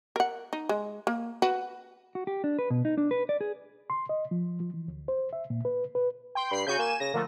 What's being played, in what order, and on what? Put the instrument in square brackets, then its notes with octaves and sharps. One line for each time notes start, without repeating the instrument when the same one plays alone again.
[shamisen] A#4 F#5
D#4
G#3
A#3
F#4 B4
[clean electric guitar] F#4
G4
D4
B4
B2
D#4
D4
B4
D5
G#4
[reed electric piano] C6
D#5
F3
F3
E3
D2
C5
E5
A#2
B4
B4
[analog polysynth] G5 C6
[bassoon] G2 [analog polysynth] B5 C7
[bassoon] C#3 [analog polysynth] F#4 G#5 G6
[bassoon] A#3 [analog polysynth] G#5 E7
[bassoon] C#3 [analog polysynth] A#6
[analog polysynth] D3 F3 A3 [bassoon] A#3